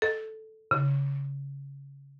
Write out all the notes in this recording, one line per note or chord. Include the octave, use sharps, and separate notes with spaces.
A4
C#3